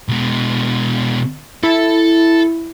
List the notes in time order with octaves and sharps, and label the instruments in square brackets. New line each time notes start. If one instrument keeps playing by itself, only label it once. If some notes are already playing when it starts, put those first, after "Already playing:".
[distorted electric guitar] B2 G#3
[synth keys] E4 [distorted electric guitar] A4